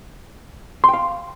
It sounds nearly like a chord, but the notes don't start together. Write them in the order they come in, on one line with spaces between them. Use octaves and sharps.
C6 G5 F5